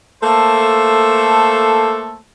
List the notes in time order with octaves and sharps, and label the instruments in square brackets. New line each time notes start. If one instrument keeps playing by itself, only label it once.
[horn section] A3 A#3 A4 C5